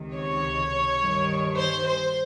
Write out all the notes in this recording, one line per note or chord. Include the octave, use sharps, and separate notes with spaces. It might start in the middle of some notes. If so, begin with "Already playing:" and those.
Already playing: C#2 C3 D#3
C#5
G2 D#3
C5
C5